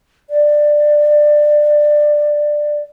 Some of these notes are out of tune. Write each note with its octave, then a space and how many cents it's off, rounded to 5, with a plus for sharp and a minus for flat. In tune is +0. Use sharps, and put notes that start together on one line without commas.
D5 +15